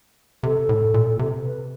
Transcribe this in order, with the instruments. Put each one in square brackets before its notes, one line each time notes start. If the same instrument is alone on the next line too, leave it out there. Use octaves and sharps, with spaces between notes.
[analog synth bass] C3 [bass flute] A4
[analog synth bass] A2
A#2
C3
[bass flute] B4